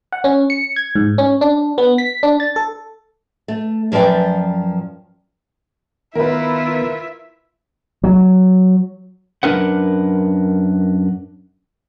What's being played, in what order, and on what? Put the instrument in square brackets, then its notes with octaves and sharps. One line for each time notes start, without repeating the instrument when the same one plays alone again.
[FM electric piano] F#5
C#4
C#7
G#6
G#2
C#4
D4
B3
B6
D4
A6
A4
[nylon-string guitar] A3
F#2 F3 B4 D5 G5
[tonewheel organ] D#3 B3 [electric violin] E4 F4 [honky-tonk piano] A#4 B4 [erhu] E5
[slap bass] F#3
[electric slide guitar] F#2 D4 A#4 B4 F#5